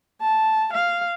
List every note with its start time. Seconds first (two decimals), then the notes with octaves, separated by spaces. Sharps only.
0.21 A5
0.73 F5